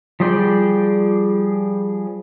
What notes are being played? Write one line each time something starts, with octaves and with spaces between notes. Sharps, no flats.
F3 G3 G#4 D5 G5